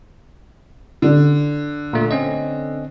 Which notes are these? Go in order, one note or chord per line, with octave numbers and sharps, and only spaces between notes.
D3
A#2 A3
C4 C#4 D#5